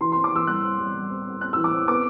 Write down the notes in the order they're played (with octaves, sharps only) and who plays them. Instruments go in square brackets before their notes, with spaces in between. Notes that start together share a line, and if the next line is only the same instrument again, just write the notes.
[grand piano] E3 C6
C4 C6
D6
E3 E6
G3 F#6
C4
G3
G3
C4
C4
C4 F#6
E3 E6
D6
C4
B3 D6